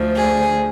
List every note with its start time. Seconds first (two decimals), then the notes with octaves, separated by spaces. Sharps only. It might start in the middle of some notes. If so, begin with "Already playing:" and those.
Already playing: D2 D3 F3
0.16 G#4